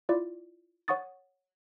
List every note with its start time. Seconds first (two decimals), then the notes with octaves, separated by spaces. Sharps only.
0.09 E4 F4 D5
0.88 C#5 F#5 C#6 D#6 A6